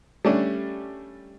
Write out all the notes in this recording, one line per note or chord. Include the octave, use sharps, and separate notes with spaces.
G3 A3 C#4 D4